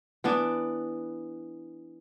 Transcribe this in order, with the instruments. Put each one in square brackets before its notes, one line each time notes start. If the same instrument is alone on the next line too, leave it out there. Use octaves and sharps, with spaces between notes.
[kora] E3 B3 D4